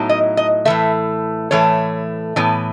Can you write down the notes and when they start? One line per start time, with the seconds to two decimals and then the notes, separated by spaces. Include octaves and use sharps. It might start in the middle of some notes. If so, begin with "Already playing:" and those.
Already playing: A2 F#3 B3 D#4
0.09 D#5
0.37 D#5
0.65 A2 E3 A3 E5
1.51 A2 E3 A3 C#5
2.36 A2 E3 B3